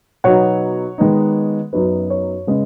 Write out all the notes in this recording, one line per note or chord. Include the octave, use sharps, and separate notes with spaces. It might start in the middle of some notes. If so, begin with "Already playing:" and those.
B2 F#3 B3 D#4 C#5 F#5
D#3 G#3 B3 D#4
F#2 F#3 B3 D#4 B4
C#5
C#3 G#3 C#4 B4 D#5